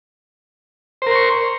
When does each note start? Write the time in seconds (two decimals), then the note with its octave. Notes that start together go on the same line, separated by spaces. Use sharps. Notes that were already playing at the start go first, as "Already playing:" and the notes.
1.02 C5
1.06 A#4
1.11 C6
1.16 C#6